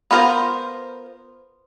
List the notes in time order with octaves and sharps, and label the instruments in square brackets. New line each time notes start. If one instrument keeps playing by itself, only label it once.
[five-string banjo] B3 F4 A#4 C5